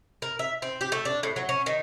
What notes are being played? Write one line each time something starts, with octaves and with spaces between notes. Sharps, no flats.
A#4
E5
C4
G4
A3
D4
A2
F#3
C#4
D#3